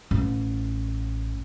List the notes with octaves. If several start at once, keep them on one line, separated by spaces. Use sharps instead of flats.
A1